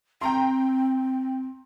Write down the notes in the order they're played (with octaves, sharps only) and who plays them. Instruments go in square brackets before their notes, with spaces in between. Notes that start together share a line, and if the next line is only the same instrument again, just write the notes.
[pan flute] C4 [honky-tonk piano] G5 A#5 C6